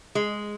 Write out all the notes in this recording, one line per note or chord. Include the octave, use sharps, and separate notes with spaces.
G#3